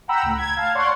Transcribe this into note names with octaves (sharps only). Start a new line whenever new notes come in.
F#5 G5 A#5 B5 E6
C#2 A2
G#6
F5 A5
C#5 D5 F#5 C6 C#6